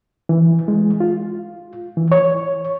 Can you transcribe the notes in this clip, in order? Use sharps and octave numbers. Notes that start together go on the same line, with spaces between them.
E3
G#3
F4
E3
C#5